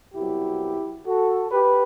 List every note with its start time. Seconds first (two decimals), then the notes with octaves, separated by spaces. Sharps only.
0.14 C2 B2 F#3 E4 G4
1.06 F#4 A4
1.51 G4 B4